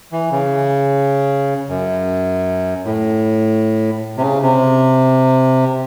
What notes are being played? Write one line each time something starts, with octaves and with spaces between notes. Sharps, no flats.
E3
C#3
F#2
A2
C3
C#3
C3